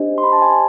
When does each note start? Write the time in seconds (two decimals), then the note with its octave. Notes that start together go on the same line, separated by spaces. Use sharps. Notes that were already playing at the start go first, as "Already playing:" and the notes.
Already playing: D4 G4 C5 D#5
0.18 C6
0.24 B5
0.33 A5
0.42 G#5
0.52 G#5